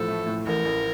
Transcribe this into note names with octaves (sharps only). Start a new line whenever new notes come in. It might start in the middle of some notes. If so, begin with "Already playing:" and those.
Already playing: A1 A2 F3 A4
A3
A2
A1 A#4
A1